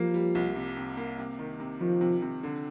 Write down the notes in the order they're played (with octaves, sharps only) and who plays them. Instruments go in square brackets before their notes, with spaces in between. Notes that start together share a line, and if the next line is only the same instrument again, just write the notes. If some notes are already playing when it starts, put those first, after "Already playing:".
Already playing: [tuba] F3 [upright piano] G3 A#3
[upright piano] G3
C2
C3
C3
A#3
C3
D#3
C3
[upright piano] D#3 [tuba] F3
[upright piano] C3
C3
D3